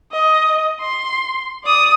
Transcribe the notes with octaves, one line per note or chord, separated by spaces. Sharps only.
D#5
C6
D5 D#6